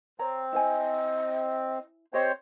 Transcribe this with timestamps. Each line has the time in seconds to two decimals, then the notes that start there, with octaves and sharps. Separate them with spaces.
0.19 C4 C#5 A#5
0.53 E4 C5 D#5 G#5
2.14 C4 G4 C5 C#5 D#5